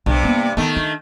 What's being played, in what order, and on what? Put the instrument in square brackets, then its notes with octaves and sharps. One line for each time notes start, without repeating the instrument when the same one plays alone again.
[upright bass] B1 [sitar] G2 C3
[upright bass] A#3 B3
[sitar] D#3 A3 [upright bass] B3
[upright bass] D4